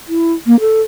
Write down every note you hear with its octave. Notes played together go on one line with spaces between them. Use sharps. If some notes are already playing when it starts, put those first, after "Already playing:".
E4
A#3
A4